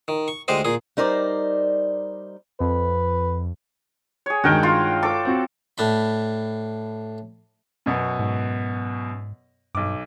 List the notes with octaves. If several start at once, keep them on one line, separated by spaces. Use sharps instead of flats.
D#3
C#6
D2 G#3 G4 C5 D#5
A#2 G#4
G3 D#4 A#4 C5 D5
F2 B4
G#4 C#5
G2 D#3 G#3 F#4 A#4 G5
F4
A4 D6
C4 F#4
A2 D4 B5
F#2 B2 B3
G#2
B1 G2 D6